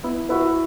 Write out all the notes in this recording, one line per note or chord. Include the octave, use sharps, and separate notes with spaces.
B3 E4
E4 F#4 B4